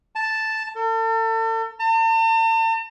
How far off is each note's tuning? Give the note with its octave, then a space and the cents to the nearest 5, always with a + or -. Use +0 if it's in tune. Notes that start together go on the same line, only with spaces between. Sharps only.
A5 +0
A4 +40
A5 +45